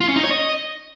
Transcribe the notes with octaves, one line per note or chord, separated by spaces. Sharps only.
F4
C#4
D#4
C#5
D#5